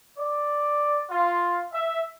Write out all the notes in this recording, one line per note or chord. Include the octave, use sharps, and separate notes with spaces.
D5
F4
E5